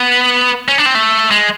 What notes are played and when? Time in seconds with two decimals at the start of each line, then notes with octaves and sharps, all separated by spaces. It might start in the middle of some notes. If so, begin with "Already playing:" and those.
Already playing: B3
0.68 C#4
0.78 D4
0.86 C4
0.95 A3
1.31 G#3